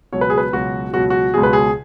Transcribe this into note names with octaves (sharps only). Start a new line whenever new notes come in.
C#2 B2 F#3 C#5
B4
G#4
B4
C#2 B2 F#3 F#4
C#2 B2 F#3 F#4
F#4
C#2 B2 F#3 G#4
B4
G#4